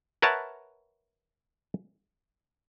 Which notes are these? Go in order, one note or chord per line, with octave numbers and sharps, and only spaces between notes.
A#4 B4 C#5 E5 F#5 A5